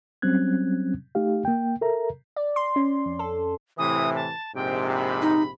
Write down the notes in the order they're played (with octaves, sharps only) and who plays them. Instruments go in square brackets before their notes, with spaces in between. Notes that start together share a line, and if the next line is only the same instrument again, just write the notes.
[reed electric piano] F#3 G3 C4 C#4 F#6 G#6
A3 D#4 G4 F5
A#3 G5
A4 A#4 E5 A#5
[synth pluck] D5
C6
C#4
F2
A4
[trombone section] A2 C3 E3 [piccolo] D#6
[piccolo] A5
[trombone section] A#1 G#2 C3 [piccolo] G5
[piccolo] B5
[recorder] D#4